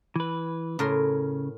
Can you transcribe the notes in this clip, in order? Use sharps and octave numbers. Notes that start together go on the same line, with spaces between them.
E3 B4
A2 C#3 A#4 C6